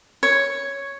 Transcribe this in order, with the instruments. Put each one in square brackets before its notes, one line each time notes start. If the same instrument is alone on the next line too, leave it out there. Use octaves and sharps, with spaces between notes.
[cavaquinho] C#5